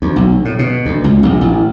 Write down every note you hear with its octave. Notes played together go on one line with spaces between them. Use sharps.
D2
B1
A2
B2
D2
C#2
A#1
A1